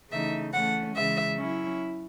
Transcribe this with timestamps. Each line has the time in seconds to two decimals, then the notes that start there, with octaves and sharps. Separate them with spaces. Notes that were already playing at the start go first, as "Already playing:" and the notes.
0.11 C#3 E3 A3 D#4 E5
0.52 E3 A3 C#4 F#5
0.95 C#3 E3 G#3 E5
1.38 F#3 C#4 E4